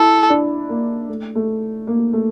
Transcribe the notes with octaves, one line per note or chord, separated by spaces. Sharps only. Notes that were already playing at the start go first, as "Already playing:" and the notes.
Already playing: E4 A4
D4
A#3
A3
A3
A#3
A3